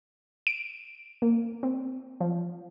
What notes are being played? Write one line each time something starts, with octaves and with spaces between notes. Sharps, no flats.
D7
A#3
C4
F3